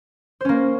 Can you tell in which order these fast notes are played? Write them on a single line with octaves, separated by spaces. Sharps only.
C5 C#4 A#3